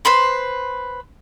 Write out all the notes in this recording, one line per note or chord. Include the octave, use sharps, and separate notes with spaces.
B4 C5 B5 C6